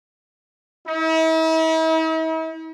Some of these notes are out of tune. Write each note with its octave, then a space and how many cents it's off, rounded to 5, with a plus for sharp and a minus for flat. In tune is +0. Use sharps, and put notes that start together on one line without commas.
E4 -45